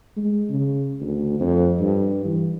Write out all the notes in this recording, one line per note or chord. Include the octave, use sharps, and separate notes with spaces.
G#3
C#3
D2
F2
G2
E3